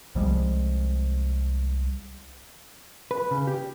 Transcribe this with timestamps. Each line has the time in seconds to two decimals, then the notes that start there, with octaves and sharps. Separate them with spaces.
0.15 C2 F3 G3 G#3
3.11 B4
3.31 C#3
3.47 G4